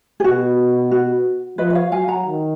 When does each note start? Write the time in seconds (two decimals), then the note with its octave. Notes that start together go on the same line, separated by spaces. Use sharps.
0.20 G#4
0.24 B2 F#4
0.91 F#4
1.58 F3 B4 D#5
1.70 D#5
1.75 C#5 F5
1.92 F#3 F5 G#5
2.08 F#5 A#5
2.25 D#3